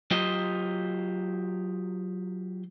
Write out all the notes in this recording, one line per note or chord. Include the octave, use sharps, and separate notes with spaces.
F#3 F4 G4 C5 D#5